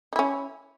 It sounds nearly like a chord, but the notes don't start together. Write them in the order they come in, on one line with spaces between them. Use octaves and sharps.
D#4 E4 C#4